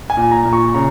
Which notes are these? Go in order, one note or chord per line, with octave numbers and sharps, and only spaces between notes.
G#5
A#2
A#5
A#2
C#6
C#3 A#5